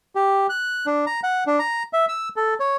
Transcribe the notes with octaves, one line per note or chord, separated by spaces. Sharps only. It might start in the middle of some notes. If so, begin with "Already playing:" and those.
G4
F#6
D4
A#5
F#5
D4
A#5
E5
E6
A4
C#5